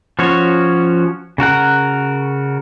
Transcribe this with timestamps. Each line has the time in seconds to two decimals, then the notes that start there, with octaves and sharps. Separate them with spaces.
0.19 F3 C#4 F#4 C#5
1.38 C#3 F#4 A#4 F#5